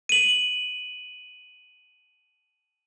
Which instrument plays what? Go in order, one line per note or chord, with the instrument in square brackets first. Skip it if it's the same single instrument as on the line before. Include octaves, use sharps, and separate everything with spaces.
[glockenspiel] D#7 F#7